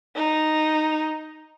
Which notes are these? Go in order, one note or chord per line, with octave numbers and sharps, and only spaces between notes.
D#4